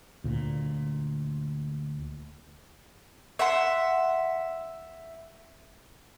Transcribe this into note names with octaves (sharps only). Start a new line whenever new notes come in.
D2 A#2
E5 F#5 C6